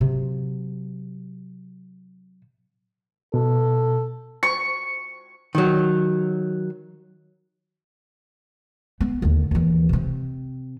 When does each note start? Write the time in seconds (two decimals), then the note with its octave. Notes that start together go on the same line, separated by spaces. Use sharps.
0.01 C3 F#3
3.34 B2 A4
4.43 C#6
5.55 D#3 F#3
9.01 B3
9.22 D#2 D3
9.51 D#2 E3
9.89 C3 C4